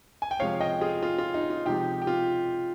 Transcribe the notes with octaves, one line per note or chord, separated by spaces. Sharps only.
G#5
G5
C3 F3 G#3 C#5 F5
D#5 G5
F4 G#4
F4
F4
D#4
F4
C3 F3 G#3 D#4 G4
G4
F4